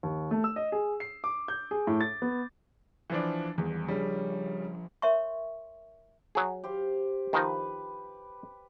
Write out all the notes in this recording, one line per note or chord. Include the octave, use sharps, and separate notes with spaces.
D#2
A3
E6
D#5
G#4
C7
D6
G6
G#4
A2
A6
B3
E3 F3 D4
E2 D#3 E3 G3
C#3 F3 G3 C#4 D4
A#4 C#5 E5 C6 C#6
F#3 G#4
G4 C5 F5
D#3 F3 D#4 B4